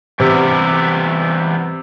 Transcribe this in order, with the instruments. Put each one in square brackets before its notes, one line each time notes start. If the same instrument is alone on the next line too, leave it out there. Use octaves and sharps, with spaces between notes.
[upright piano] C3 [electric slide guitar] E3 G3 B3 E4 G4